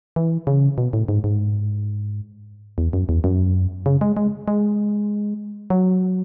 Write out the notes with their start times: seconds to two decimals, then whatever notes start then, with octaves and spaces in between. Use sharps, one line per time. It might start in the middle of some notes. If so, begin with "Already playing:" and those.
0.16 E3
0.47 C#3
0.78 B2
0.93 A2
1.08 G#2
1.24 G#2
2.78 E2
2.93 F#2
3.09 E2
3.24 F#2
3.86 C#3
4.01 G#3
4.17 G#3
4.48 G#3
5.70 F#3